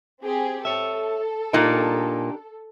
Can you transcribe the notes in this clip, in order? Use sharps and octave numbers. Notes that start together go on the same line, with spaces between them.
C4 G4 G#4
A4 C#5 E5
A#2 D4 D#4 G4 A#4